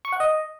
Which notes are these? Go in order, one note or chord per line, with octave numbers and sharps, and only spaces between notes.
C#6
F#5
D#5